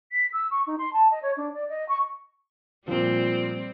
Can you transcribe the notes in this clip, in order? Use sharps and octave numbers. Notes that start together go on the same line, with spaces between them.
B6
E6
C#6
D#4
C6
A5
D#5
C#5
D4
D5
D#5
C#6
A#2 F3 G3 C4